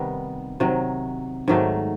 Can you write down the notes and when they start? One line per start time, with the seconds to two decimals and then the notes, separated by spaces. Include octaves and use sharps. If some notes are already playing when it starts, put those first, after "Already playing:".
Already playing: C3 D#3 G3 B3
0.60 C3 D#3 F#3
1.48 G#2 D#3 F#3 A3